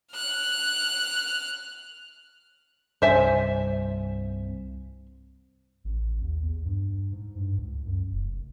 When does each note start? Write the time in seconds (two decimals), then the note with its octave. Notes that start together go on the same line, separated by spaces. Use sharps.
0.12 F6 F#6
3.02 C2 G2 C3 C5 E5 G#5
5.84 A1
6.21 D#2
6.42 E2
6.65 G2
7.12 G#2
7.36 G2
7.57 C#2
7.86 F#2
8.12 F1